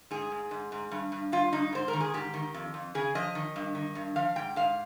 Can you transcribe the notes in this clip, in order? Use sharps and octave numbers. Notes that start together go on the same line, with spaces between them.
G#2 G#4
G#2
G#2
G#2
G2
G2
G2 F4
G2 D#4
G#2 C5
A#4
D#3
G#4
G#2 G4
D#3
F2
F2
C#3 G#4
F3 D#5
D#3
G2
D#3
G2
F3 F5
G#2 G5
G#2 F5